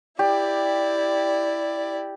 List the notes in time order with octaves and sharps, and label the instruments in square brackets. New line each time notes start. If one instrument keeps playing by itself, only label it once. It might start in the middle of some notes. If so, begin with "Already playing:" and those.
[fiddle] E4 D5 [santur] G4